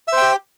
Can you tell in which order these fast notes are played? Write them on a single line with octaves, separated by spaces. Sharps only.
E5 C5 G5 G4